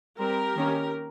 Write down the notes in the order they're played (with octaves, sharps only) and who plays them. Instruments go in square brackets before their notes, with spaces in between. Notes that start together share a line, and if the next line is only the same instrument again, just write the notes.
[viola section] G3 C4 G4 A#4
D#3 A#3 C#4